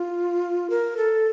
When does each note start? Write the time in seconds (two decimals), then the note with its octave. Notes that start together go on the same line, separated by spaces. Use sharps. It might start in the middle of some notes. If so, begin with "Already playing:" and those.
Already playing: F4
0.70 A#4
0.97 A4